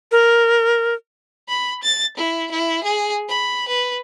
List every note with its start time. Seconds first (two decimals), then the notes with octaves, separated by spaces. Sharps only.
0.12 A#4
1.49 B5
1.83 A6
2.17 E4
2.51 E4
2.83 G#4
3.29 B5
3.68 B4